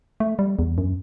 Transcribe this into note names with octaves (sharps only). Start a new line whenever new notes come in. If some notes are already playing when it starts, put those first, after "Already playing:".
A3
G3
E2
F#2